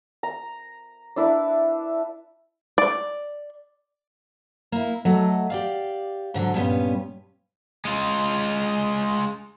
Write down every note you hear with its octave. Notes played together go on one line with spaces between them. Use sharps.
A#5
D4 E4 B4
D5
A#3 E4
F#3 A3 A4 D#5
G4 D5 F5
G#2 D3 E3 F#3
G2 A#2 G3 B3 C#4
G#3 F4